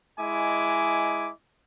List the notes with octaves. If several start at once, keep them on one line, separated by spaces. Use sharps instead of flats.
G#3 E4 D#5 G#5 D6